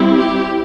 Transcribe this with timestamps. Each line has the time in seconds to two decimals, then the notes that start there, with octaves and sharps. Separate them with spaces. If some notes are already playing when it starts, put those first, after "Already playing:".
Already playing: G3 C4 E4
0.15 G4